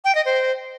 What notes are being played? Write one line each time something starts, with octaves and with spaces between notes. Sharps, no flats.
G5
D#5
C5